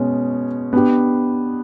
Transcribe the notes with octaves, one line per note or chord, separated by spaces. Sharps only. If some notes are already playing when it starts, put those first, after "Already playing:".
Already playing: B2 G#3 C#4
B3 D4 G4